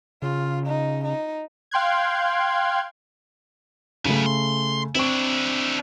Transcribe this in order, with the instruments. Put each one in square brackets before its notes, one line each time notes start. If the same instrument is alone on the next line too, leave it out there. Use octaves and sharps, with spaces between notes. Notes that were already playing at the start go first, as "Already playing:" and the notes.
[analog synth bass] C#3 [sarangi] F4
[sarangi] D#4
D#4
[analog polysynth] F5 G5 C6 F#6 G#6
[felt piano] C#3 A3 [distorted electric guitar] F#3 B4
[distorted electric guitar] C6
[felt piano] C4 C#6 [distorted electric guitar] D4 E4